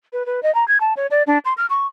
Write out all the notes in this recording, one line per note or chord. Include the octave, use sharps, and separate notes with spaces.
B4
B4
D#5
A#5
G#6
A5
C#5
D5
D4
C6
F6
C#6